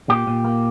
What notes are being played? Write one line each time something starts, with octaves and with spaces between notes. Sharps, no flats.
A#2 G4
A#2
A#3